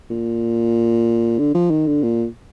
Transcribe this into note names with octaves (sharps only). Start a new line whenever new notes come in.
A#2
D3
F3
D#3
D3
A#2